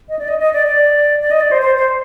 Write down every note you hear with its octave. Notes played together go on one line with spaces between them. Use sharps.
D#5
D5
D#5
D#5
D5
D5
D5
D#5
D5
C5
C5
C5